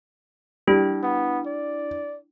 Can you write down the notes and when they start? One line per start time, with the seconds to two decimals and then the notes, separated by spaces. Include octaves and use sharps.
0.68 G3 D4 E4
1.03 B3
1.46 D5